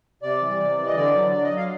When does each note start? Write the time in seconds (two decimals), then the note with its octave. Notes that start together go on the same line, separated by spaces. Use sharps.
0.22 C3 D5
0.41 E3 G3
0.59 C3
0.77 E3 G3
0.86 D#5
0.95 D3 D5
1.14 F#3
1.32 D3 D5
1.44 D#5
1.51 F#3
1.57 F5